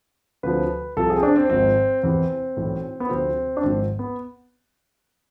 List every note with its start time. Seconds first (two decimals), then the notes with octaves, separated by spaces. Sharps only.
0.43 D2 C3 F3 B4
0.97 C2 C3 F3 A4
1.10 G#4
1.17 C4
1.23 D4
1.36 C4
1.49 G#1 G#2 F3 C4
2.03 E2 C3 E3 C4
2.57 B1 A2 E3
3.00 B3
3.09 D2 C3 F3 C4
3.57 D4
3.62 G#1 G#2 F3 C4
3.99 B3